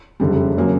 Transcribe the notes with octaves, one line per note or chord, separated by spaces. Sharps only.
F#1 F2 D3 G3
C#3 F#3 A#3